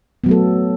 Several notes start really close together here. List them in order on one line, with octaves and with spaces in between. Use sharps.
B3 F#3 A3 A4